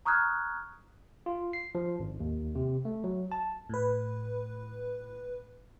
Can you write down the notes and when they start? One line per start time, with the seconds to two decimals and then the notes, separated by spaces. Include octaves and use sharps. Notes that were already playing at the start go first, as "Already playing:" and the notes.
0.05 A#5 C#6 D#6 F6 F#6 G#6
1.26 F4
1.53 C7
1.75 F3
2.00 G#1
2.20 D#2
2.55 C3
2.85 A3
3.04 F#3
3.32 A5
3.69 A2 B4